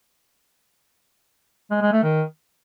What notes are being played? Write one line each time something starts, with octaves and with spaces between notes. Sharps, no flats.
G#3
G#3
A3
D#3